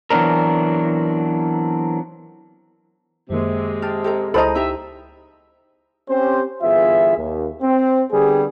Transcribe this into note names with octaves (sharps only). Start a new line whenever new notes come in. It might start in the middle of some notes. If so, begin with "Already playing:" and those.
E3 F#3 B3 C4 D4 A#4
F#2 C3 D#3 G#3 A#3
G4 A5 F6
G4 A4 A#5
C#2 E4 A4 C5 D#5 A#5 B5 D#7
D#4 G4 E5 A#5
C4 C#4 G4 C5
G1 E3 B3 F4 G#4 E5
D#2
C4
D3 G3 B3 G4 G#4